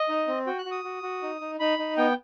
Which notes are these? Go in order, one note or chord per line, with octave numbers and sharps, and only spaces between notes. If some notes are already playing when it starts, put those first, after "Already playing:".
Already playing: D#5
D#4
C4
F#4 G5
F#6
F#4
D#6
F#4
F#4
D#4
D#4
D#4 B5
D#4
B3 G5